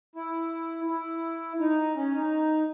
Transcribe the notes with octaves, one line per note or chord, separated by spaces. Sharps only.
E4
E4
D#4
C#4
D#4